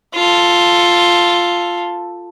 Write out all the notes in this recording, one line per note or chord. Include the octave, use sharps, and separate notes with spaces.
F4 A4